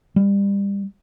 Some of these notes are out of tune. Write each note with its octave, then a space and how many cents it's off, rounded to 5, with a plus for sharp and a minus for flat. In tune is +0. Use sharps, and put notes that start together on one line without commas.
G3 +30